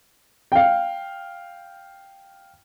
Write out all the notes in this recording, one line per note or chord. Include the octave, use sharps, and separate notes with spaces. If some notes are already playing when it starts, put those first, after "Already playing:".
F5 G5